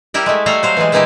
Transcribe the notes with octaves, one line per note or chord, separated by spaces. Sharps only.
G3 E4 G4 A#4
G#3 A3
G3 A3 A4 F5 A#5
F#3 C5 F5
E3 G3 G#3
A#2 E3 G#3 D#4 E4 G4